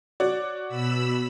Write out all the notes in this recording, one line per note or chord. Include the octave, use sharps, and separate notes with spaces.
F#4 C#5 D5
B2 B5 E6